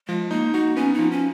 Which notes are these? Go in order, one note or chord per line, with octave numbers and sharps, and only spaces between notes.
F3 G#3
A#3 D#4
D#4 F#4
B3 C#4
F3 D#4
C#4